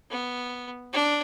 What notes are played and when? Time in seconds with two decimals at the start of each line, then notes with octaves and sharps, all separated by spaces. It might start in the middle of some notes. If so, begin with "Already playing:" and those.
0.10 B3
0.93 D4